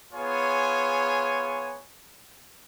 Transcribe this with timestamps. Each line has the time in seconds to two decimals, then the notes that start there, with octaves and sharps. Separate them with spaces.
0.13 B3 F4 G#4 C#5 G#5